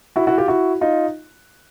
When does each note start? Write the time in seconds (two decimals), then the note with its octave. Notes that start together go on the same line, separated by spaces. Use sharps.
0.16 E4 F#4
0.27 E4 F#4
0.38 F4 G4
0.48 E4 F#4
0.81 D#4 F4